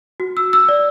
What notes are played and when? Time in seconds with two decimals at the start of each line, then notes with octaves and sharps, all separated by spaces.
0.20 F#4
0.37 E6
0.53 E6
0.69 D5